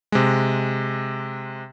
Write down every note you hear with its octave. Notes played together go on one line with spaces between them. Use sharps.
C3 G#3